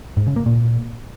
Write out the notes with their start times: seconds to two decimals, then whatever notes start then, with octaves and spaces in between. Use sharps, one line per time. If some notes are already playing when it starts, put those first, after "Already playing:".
0.17 G#2
0.27 C#3
0.36 A#3
0.46 A#2